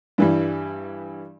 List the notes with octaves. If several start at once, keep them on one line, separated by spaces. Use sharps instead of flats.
G2 E3 G3